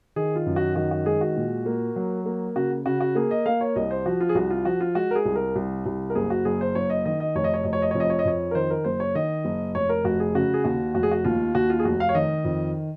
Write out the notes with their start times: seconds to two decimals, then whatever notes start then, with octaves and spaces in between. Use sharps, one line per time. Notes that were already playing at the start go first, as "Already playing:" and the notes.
0.16 D#3 G#4
0.36 F4
0.46 F#2
0.56 F#4
0.76 D#3 F#4
0.91 F#4
1.06 G#3 G#4
1.21 F#4
1.37 A#2
1.66 A#3
1.96 F#3
2.26 A#3
2.56 C#3 F#4
2.86 C#3 F#4
3.01 F#4
3.15 A#3 G#4
3.31 D#5
3.46 A#3 F5
3.61 C#5
3.76 C2 D#5
3.91 C5
4.06 F3 F#4
4.21 F4
4.29 G#4
4.35 C2 F#4
4.50 F4
4.65 F3 F#4
4.81 F4
4.95 G#3 F#4
5.11 A#4
5.15 G#4
5.26 C2
5.36 A#4
5.56 C2
5.86 C2
6.10 A#4
6.15 F#1 G#4
6.30 F#4
6.45 F#1 G#4
6.61 C5
6.75 F#1 C#5
6.90 D#5
7.05 D#3 D#5
7.20 D#5
7.35 F1 C#5
7.44 D#5
7.54 C#5
7.64 F1 D#5
7.73 C#5
7.82 D#5
7.91 F2 C#5
8.00 D#5
8.10 C#5
8.19 D#5
8.25 F2 C#5
8.51 A#4
8.55 D#3 C5
8.70 A#4
8.84 F#1 C5
9.00 C#5
9.15 D#3 D#5
9.45 F#1
9.75 F1 C#5
9.89 A#4
10.04 F1 F#4
10.20 G#4
10.35 C#3 F#4
10.54 G#4
10.64 D#2 F#4
10.95 F1 F#4
11.03 G#4
11.11 F#4
11.25 D#2 F4
11.55 D#2 F#4
11.70 F4
11.79 G#4
11.85 F1 F#4
12.00 F5
12.09 C#5
12.14 D#3 D#5
12.45 F2